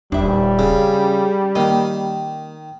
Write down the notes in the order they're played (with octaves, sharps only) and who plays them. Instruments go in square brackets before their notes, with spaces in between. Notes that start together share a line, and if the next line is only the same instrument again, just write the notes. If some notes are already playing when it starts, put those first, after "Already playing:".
[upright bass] D#1 [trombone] G3 [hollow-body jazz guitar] D4 E5
[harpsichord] C#3 [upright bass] C#4
[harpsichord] D#3 [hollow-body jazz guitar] A#3 D#5